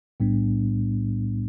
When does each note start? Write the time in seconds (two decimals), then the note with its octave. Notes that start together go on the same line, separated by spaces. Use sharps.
0.20 B1 A2 G3 B3 D4